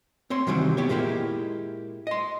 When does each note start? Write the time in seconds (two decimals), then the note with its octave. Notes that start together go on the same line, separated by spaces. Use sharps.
0.30 C4 C#5 C6
0.47 C3 D#3 E3 F#3 G3 C4
0.77 B3 G4 C#5
0.89 A#2 G#3 A#3 E4 G4
2.07 D#5 C6